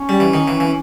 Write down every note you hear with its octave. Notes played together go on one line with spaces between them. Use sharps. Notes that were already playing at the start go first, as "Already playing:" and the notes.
Already playing: C#4
G3
E3
D#3
E3
E3
C#4